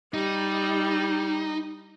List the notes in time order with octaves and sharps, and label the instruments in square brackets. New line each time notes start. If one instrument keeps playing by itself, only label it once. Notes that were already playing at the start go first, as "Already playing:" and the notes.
[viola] G3 [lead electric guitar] D#4